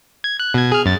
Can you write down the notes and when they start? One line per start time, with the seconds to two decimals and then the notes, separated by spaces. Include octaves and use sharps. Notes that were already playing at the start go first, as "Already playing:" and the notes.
0.24 G#6
0.40 F#6
0.54 B2 G#6
0.72 G#4 F6
0.86 F#2 A6